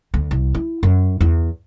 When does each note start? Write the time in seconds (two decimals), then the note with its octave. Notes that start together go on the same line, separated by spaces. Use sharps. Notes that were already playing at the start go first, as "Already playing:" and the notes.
0.14 D2
0.31 C2
0.55 E4
0.83 F#2
1.21 E2